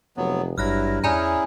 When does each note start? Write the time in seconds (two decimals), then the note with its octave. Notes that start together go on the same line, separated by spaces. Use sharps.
0.17 F1 F#3 B3
0.58 G#1 G2 F#3 E4 F6 F#6 A#6
1.04 E2 C#4 E4 G#4 D5 G#5 A#5